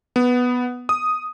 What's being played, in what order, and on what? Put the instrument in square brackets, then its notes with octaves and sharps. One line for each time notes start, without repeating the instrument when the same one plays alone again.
[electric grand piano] B3
D#6